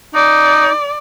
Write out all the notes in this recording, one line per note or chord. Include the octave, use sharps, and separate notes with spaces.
D#4 D5